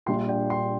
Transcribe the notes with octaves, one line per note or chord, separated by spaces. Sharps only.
A#1 A#2 G3 D4 G5 C6
D5 G5
G5 C6